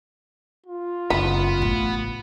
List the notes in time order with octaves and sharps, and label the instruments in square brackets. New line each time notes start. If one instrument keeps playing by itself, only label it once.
[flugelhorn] F4
[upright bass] F#1 [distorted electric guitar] B3 [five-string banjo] B5
[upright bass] A1 A2